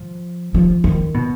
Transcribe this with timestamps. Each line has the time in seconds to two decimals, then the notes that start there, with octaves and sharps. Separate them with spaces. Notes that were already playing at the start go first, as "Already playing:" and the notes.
Already playing: F3
0.54 F3
0.84 D#3
1.14 B2